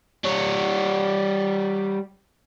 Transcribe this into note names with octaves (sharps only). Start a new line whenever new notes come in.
G3 C#5